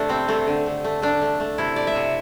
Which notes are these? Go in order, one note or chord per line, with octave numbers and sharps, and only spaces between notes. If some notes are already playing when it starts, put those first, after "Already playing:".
Already playing: C3 A3 D4
G3 C4
C3 A3
D3
A3
A3
A3 D4
A3
A3
C3 E4
A3 D5
E5
C3